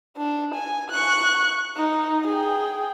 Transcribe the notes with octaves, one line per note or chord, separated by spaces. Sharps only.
D4
G#5
C#6 F#6
D#4
G#4 G5